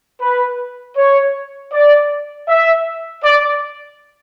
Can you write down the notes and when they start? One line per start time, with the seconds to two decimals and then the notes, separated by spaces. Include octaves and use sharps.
0.21 B4
0.97 C#5
1.73 D5
2.48 E5
3.24 D5